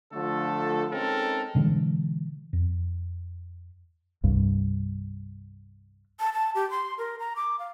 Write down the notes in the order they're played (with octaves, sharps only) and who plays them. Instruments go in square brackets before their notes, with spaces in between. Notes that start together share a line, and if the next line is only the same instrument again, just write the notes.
[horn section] D3 F3 A3 F4 A4
G#3 C4 C#4 D#4 A4 A#4
[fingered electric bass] B2 D3 E3 G#3
F2
C2 G2
[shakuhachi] A5
A5
G4
C6
A#4
A#5
D6
F5